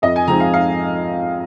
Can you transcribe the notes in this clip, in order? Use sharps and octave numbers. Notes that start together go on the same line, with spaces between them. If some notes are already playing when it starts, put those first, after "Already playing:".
F2 D#5
G#5
F3 G#3 C4 D#4 A#5
F5
F5